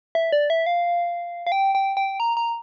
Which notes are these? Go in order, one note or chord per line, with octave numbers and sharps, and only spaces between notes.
E5
D5
E5
F5
F5
G5
G5
G5
A#5
A#5